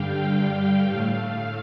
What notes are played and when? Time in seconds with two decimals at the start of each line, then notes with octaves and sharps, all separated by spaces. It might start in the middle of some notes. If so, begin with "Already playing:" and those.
Already playing: G2 D3 G3 F5 G5
0.56 F5
0.89 A2 A3 F5